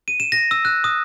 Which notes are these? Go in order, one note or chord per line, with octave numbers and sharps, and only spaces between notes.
D#7
E7
A#6
E6
F#6
D#6